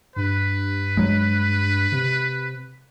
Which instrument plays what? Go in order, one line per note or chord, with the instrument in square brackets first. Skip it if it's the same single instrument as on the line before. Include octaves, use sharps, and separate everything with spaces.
[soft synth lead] G2 [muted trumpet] B4
[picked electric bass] F#3 G#3
[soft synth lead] C3